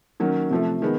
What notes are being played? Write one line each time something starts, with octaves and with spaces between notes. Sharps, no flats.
D#3 F#3 A#3 C#4
C3 F3 A3
D#3 G#3 B3